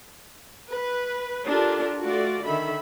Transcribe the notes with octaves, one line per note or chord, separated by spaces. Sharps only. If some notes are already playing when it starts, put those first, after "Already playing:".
B4
D4 F4 G4 A4 A#4
A3 F4 F#4 D5
D3 D#3 E5 B5